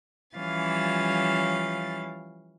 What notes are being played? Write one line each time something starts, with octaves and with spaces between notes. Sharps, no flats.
E3 F3 G3 C#4 F5 A6